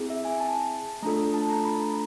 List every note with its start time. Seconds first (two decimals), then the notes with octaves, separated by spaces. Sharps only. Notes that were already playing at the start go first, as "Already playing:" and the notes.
Already playing: C4 E4 G#4
0.10 E5
0.25 G#5
0.40 A5
1.02 A3 D4 F4 A4 A#5
1.34 A5
1.50 A#5
1.65 B5
1.80 A#5